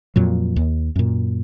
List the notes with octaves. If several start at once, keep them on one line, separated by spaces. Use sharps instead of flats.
F2 A#2 F#3
D#2
F#2 A#2